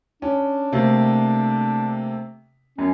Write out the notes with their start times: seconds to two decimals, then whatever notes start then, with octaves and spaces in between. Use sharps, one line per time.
0.22 C#4 D4
0.72 C3 A3 A#3
2.78 F#2 C#4